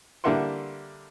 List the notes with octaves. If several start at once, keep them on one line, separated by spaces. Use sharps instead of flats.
D3 G3 A#3 E5 F#5 C6